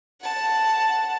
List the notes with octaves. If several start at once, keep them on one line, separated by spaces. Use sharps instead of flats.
F#5 A5